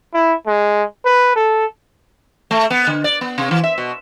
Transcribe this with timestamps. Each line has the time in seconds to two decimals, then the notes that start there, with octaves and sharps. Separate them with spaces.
0.14 E4
0.47 G#3
1.05 B4
1.36 A4
2.51 A3
2.70 B3
2.87 D3
3.04 D5
3.21 B3
3.38 C3
3.51 E3
3.64 E5
3.78 B2